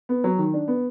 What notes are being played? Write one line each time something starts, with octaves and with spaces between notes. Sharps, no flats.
B3
F#3
D#3
D4
B3